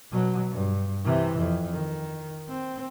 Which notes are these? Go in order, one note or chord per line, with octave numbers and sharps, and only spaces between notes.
B2 F#3
G2
C3 E3
F2
D#3
C4